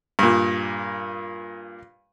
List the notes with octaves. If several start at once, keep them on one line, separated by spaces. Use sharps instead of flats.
G2 A#2